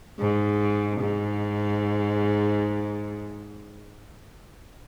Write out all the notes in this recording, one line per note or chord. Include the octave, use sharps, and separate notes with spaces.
G#2
G#2